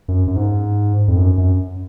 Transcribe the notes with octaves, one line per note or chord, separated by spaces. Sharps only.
F#2
F#2
G#2
F2
F#2
F#2